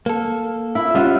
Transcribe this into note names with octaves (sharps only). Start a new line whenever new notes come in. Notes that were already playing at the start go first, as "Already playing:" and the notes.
A#3 A4
E4
G3 C#4 F4 D#5 E5 F#5